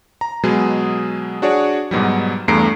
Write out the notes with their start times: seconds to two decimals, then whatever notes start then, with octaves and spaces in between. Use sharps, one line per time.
0.21 A#5
0.43 B2 F#3 G#3 G#4
1.42 D4 F#4 G#4 C#5 D5
1.91 G#2 B2 F#3 G3
2.48 E2 G2 A3 A#5 C7 D7